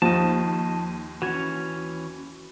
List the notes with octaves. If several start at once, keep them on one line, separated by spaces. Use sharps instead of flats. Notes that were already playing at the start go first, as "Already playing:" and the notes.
D#2 F3 D#5 A5
E3 C#4 F#4 G#6